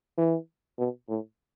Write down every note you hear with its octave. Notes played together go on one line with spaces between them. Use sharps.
E3
B2
A2